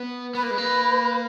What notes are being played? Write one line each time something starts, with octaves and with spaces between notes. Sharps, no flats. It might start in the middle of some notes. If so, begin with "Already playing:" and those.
Already playing: B3
B3 B4
A#3
G#3
A#3